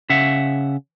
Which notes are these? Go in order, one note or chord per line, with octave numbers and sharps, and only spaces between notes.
C#3 E5 F#5